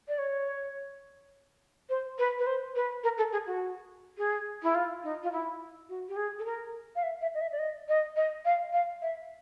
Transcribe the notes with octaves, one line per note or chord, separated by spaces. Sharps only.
D5
C#5
C5
B4
B4
C5
B4
A#4
A4
G#4
F#4
G#4
E4
F4
D#4
F4
E4
F#4
G4
G#4
A4
A#4
F5
E5
E5
D#5
E5
D5
D#5
D#5
D#5
F5
F5
E5